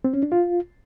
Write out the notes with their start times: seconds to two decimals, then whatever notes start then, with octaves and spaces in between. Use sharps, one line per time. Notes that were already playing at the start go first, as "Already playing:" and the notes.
0.04 C4
0.14 C#4
0.23 D4
0.32 F4